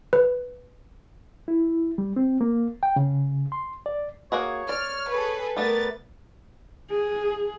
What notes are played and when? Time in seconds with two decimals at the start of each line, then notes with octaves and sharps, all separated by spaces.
0.13 B4
1.48 E4
1.98 G3
2.16 C4
2.41 A#3
2.83 G5
2.96 C#3
3.52 C6
3.86 D5
4.32 A#3 F#4 G#4 C#5
4.69 D5 F6
5.10 G#4 A4 B4
5.57 G3 A3 B3 A#4 B4 A6
6.91 G#4